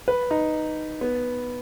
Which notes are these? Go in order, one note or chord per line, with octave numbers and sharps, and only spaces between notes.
B4
D#4
B3